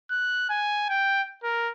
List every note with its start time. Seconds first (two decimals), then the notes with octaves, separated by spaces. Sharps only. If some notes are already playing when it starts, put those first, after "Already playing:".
0.11 F#6
0.50 G#5
0.89 G5
1.43 A#4